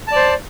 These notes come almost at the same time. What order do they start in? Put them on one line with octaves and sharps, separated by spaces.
A5 D5 C5